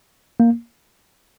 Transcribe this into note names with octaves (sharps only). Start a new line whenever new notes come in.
A#3